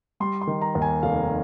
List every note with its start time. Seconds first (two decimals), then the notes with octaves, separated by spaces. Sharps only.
0.20 G3 C6
0.41 C6
0.47 D#3
0.62 A#5
0.75 D#2
0.82 G#5
1.03 F1 F5